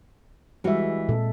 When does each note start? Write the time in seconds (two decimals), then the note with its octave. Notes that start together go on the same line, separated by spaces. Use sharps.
0.64 E3 G3 G#3 F#4 E5
1.09 A#2 C4 A4